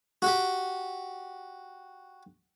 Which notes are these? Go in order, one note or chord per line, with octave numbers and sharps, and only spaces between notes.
F#4 G4